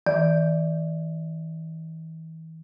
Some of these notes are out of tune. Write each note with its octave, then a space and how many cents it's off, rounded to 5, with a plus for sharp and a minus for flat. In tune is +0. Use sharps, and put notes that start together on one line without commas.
E3 -40 D5 -5